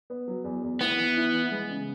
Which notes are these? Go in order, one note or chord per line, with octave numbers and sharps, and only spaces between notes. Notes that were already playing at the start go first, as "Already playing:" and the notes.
B3
F#3
E2
E2
B3 E4
E3
E4
E3
G#3
C#3